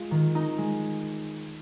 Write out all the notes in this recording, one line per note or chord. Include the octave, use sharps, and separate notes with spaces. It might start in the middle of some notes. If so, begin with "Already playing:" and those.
Already playing: G#3 F4
D#3
D#4
G#3